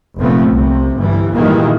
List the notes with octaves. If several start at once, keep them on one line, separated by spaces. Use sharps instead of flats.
F1 A#2 F3 A3 B3 C4
C2 C3
G1 E3 G3
A#2 D#3 E3 G3 G#3 A#3